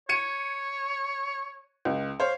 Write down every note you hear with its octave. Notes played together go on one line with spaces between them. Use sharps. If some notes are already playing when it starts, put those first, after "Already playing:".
C#5 G#6 C#7 D#7
C#2
C5 C#5 F5